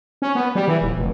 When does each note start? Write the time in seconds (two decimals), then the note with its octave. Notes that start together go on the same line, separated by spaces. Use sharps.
0.22 C#4
0.35 B3
0.55 G3
0.68 E3
0.82 D#1
0.97 F1